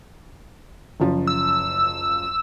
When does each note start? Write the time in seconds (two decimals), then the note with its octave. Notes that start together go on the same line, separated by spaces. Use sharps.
1.00 F#1 C#3 F3
1.27 E6